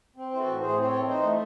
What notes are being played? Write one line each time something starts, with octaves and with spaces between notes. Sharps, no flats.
C4
E3 C5
F#4 A4
A2
A2 G#4 C5
C4 C5
A4 C#5
E3
D#4 C5 D#5
A3 D#5